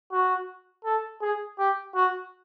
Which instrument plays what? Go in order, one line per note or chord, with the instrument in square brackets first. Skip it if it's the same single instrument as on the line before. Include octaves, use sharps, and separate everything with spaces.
[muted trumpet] F#4
A4
G#4
G4
F#4